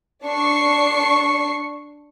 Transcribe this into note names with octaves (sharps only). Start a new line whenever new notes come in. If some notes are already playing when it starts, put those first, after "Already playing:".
D4 C#6 C7